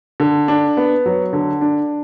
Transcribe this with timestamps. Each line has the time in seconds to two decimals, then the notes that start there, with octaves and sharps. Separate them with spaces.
0.20 D3
0.48 D4
0.77 B3
1.06 F#3
1.33 D3
1.61 D4